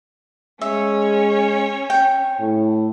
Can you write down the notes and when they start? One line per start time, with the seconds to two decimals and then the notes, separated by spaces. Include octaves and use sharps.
0.61 G#3 C#4 C#5 E5
1.90 G5
2.40 A2